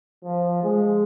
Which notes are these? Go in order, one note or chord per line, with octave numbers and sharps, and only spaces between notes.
F3
G#3